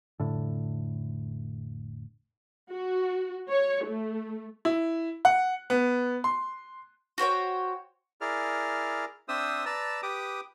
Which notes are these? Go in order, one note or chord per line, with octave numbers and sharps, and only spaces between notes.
F1 A2 D3
F#4
C#5
A3
E4
F#5
B3
C6
F#4 C5 C#5 G5
E4 G#4 A#4 D5 F6
C4 D4 C5 E5 D#6 E6
B4 D5 A5 A#5 E6
G4 B4 D6 D#6